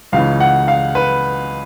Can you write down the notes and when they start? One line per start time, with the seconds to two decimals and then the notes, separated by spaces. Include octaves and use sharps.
0.12 C#2 C#3 E3 F5
0.40 F#5
0.68 F5
0.95 B4